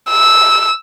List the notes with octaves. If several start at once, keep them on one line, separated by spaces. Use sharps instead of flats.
E6